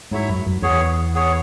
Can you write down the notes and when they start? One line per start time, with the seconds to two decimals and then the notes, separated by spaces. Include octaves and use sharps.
0.11 G#2 F#3 E4 C#5 E5
0.29 F#2
0.46 F#2
0.62 E2 B3 G#4 C#5
1.14 B3 G#4 C#5